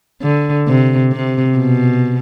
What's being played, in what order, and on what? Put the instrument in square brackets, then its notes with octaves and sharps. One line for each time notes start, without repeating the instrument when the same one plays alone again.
[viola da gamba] D3
C3
C3
B2